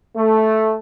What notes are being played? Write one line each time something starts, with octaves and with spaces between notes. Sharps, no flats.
A3